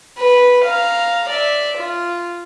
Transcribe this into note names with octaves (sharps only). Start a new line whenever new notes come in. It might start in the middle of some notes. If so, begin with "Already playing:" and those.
B4
F5 A#5
D5 E5
F4